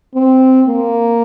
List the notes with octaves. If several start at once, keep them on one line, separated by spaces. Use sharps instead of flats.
C4
A#3